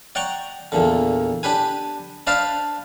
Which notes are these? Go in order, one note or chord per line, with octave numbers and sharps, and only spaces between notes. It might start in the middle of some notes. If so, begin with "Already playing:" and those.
D5 F#5 G5 A#5 C#6
E2 A#2 D3
D4 G4 B4 G#5
D4 B4 C5 D5 F5 A5